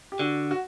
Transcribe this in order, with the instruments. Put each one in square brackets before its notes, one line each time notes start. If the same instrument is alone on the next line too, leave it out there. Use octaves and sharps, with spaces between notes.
[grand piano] G4
[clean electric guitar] D3 [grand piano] F#4
[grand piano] F#4